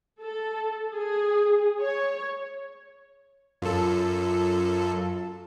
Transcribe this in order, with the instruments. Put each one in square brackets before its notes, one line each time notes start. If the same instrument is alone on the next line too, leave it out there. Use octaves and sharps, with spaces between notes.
[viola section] A4
G#4
C#5
[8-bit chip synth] F#2 A4 [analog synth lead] F4